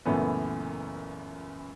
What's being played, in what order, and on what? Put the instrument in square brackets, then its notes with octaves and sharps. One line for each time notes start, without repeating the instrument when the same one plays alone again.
[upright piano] C#2 F#2 A#2 E3 A3 B3